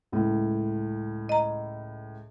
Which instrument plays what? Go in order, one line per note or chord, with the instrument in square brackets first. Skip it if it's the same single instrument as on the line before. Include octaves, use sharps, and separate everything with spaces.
[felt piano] C#2 A2
[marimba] D#5 A#5